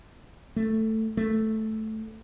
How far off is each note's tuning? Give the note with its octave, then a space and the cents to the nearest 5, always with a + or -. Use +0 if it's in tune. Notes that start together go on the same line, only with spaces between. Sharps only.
A3 +5
A3 -5